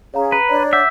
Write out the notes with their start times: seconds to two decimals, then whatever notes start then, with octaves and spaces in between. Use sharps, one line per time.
0.14 C#4 G#4 C#5 F5 A#5
0.32 B4 A#5
0.49 D4 C#5 D5 A#5
0.73 E5 F#5 D6 G6